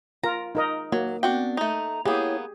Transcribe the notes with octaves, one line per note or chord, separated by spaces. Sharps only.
F4 A#4 A#5
D#4 A#4 D#5
F#3 A#3
B3 C4 D4 F#4 G5
A3 D#4 A#5
A#3 B3 E4 G4 G#4 C#5